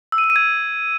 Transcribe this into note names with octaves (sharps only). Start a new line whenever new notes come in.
E6
D#7
E6
D#7
G#6